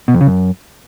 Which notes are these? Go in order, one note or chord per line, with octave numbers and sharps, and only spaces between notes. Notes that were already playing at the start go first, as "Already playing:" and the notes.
B2
F2
C#3
F#2